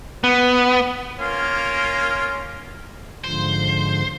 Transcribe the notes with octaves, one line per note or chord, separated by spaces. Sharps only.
B3
A#3 C#4 F4
G#2 D3 F3 C5